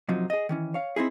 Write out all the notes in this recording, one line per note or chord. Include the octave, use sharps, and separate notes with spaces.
F#2 C3 F3 F#3 D#4
G#4 D#5
D#3 E3 C#4
C#5 F5
C4 D#4 E4 G#4